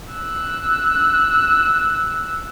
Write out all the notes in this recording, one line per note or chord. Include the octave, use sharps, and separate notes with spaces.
E6 F#6